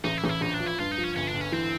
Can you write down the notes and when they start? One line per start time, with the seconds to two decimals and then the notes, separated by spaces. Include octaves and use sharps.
0.04 A1 D#4
0.17 E4
0.24 A1 D#4
0.29 E4
0.41 A#1 D#4
0.54 D4
0.60 F3
0.66 E4
0.79 G2 F4
0.91 D#4
0.98 F3
1.03 C#4
1.16 G1 C#4
1.28 D4
1.34 G1
1.41 C#4
1.52 E3 C4